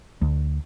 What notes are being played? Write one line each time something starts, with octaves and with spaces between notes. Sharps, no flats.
D2